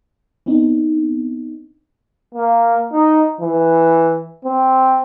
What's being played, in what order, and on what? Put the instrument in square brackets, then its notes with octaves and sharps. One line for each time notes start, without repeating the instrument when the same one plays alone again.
[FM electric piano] B3 C4 D4 D#4
[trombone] A#3
D#4
E3
C4